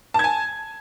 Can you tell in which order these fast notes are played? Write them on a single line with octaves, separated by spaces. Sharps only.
A5 G#6 G#5